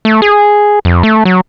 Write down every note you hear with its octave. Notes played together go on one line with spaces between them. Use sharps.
A3
G#4
F2
A3
F#3